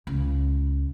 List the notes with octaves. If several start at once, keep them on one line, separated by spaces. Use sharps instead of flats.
C#2